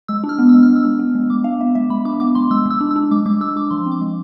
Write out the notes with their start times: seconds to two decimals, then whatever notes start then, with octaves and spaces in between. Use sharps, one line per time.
0.08 G#3 E6
0.24 D4
0.29 F6
0.39 B3
0.49 G#3 E6
0.63 F6
0.70 G#3
0.76 E6
0.85 D4
0.99 B3
1.15 G#3
1.30 G#3 D6
1.44 D4 F5
1.59 B3 E5
1.75 G#3 E5
1.90 G#3 B5
2.05 D4 D6
2.20 B3 D6
2.35 G#3 C6
2.51 G#3 E6
2.66 G#3 E6
2.81 D4
2.91 E6
2.96 D4
3.11 G#3 D6
3.26 G#3 D6
3.41 D4 E6
3.56 D4 D6
3.71 F3 C6
3.86 C4
3.91 D6
4.01 G#3